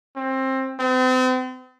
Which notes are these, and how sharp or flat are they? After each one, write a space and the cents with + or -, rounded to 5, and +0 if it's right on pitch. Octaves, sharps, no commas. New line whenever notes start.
C4 +20
C4 -40